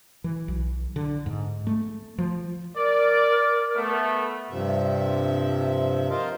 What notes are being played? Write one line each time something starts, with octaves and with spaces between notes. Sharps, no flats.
E3
B1
D3
G#2
A3
F3
A#4 D5
A3 B3
G2 C3 F3 E5
F4 A#4 C5 D#5 F5